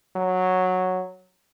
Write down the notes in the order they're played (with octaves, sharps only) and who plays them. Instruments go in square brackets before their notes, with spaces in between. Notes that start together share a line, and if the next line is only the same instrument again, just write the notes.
[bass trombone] F#3